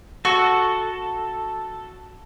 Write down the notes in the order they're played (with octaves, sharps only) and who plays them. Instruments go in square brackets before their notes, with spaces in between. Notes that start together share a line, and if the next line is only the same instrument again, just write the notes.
[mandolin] F#4 [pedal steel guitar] A4